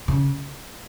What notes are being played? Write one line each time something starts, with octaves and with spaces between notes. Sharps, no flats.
C#3